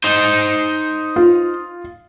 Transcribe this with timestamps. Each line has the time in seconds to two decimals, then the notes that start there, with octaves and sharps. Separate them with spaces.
0.04 D#4 C5
1.16 F4